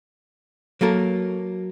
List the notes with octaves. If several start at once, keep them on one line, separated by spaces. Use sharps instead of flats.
F#3 A#3 A4 A#4